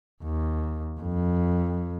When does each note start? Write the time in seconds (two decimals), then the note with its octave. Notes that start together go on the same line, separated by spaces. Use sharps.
0.23 D#2
1.00 F2